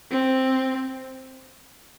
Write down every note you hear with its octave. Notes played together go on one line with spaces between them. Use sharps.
C4